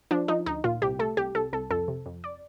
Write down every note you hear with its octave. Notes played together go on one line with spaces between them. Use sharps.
F3 D4
F3 D#4
D2 D#4
A#2 F4
C2 G4
A3 A4
C2 G4
C2 A4
C2 A4
F2 A4
C3
F2
D5